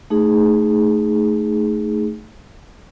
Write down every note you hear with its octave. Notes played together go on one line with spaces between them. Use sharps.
A3 D#4 G#4